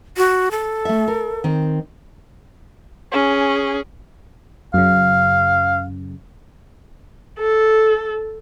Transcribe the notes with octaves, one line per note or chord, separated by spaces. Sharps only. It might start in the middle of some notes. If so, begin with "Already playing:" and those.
F#4
A4
A3 E5
A#4
D#3 C4
C#4 G#4
F#2 C#3 F5
A4